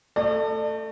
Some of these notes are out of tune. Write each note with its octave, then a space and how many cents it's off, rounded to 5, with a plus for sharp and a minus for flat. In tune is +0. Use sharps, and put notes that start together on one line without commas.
A3 +15 D5 +45